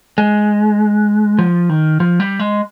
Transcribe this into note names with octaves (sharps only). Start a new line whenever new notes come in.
G#3
F3
D#3
F3
G3
G#3